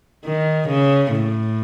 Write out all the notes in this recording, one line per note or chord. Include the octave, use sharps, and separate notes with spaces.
D#3
C#3
A2